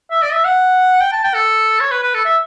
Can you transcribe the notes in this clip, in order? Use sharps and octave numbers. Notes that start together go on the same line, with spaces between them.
E5
D5
E5
F#5
G5
A5
G5
A4
C#5
B4
B4
A4
E5